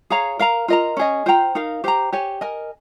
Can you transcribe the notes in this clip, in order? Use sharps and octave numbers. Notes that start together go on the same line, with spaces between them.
G#4 C#5 F5 A#5
A#4 F5 A#5
F4 A#4 D#5 A#5
C#4 G#4 D#5
F4 C5 G5 A#5
D#4 A#4 F5
G4 C5 G5 A#5
G4 C#5 G#5
A#4 D#5 G#5